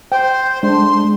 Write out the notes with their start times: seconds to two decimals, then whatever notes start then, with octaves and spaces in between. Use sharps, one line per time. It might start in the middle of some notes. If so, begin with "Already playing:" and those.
0.12 C5 G5
0.63 G#3 D4 C6